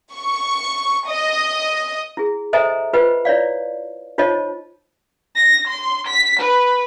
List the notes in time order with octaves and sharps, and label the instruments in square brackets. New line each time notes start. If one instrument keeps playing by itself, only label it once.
[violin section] C#6
D#5
[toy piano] E4 G#4
A4 C5 D#5 E5 G#5 A#5
F4 B4 C5 D#5 G5
E4 C#5 D5 F5
D#4 F4 C5 C#5 D#5 A5
[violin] A#6
C6
B6
B4